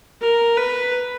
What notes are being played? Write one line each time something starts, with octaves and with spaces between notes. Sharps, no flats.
A#4
B4